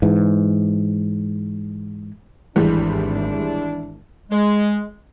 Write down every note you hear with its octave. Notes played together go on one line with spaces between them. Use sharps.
G#2 E3
G#1 E2 A2 G3 G#3 D4 E4
G#3